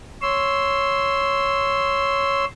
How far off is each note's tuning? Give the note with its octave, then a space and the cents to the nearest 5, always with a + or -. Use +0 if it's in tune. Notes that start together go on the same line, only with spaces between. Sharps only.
C#5 +0 C6 +0 E6 +0